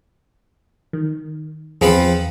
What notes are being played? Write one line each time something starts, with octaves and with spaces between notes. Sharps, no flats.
D#3
E2 F3 C4 G#4 B4 C#7